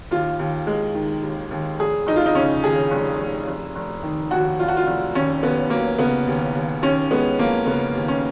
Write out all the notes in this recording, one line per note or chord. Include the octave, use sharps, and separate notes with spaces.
D#2 F4
D#2
G#3
D#3
D#2
D#2
F1 G#4
F1 D#4
F4
D#4
C#3 C#4
D#2 G#4
F1
F1
F1
F1
D#3
D#2 F#4
F1 F4
F#4
F4
F1
D#2 C#4
D#2 B3
F#3 A#3
C#3 B3
D#2
D#2
D#2 C#4
G#3 B3
F3 A#3
C#3 B3
D#2
C#4